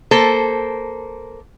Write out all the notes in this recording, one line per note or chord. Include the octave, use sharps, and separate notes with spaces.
A#3 A4 C5